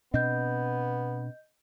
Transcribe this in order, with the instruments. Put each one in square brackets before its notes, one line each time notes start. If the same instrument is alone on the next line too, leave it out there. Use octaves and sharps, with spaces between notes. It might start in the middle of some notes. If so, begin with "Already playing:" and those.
[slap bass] B2 C4 D4 [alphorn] B3 [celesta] D#5 G6